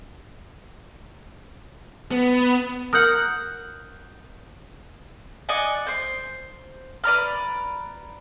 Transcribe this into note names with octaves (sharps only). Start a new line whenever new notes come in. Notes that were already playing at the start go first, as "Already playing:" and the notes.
B3
A#4 F#5 D#6 F#6 G6
D5 D#5 F#5 G#5
C5 G6
B4 D5 A#5 F6